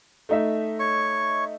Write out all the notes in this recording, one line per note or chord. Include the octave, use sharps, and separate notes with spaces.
A3 D#4 E5
C#5 C#6